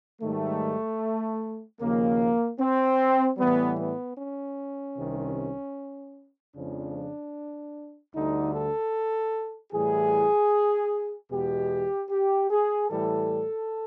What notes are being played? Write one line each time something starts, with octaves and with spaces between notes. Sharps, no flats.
G#2 D#3 G3 A3
D#2 C#3 F3 A#3
C4
A2 E3 G3 B3
B3
C#4
C2 C3 D#3
F2 C#3 F3 G#3 D4
D2 D3 G3 D#4
A4
A2 E3 G3 G#4
E2 B2 G#3 G4
G4
G#4
A2 E3 G3 A4